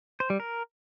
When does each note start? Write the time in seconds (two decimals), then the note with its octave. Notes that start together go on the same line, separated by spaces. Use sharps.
0.20 C5
0.30 G3
0.40 A#4